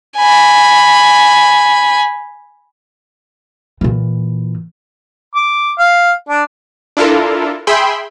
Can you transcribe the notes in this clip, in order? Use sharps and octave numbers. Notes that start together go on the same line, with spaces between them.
G#5 B5
A#2 E3
D6
F5
D4
D4 E4 F4 A4 A#4
G#4 E5 G5 B5 C6